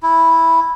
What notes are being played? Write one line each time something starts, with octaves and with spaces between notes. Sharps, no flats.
E4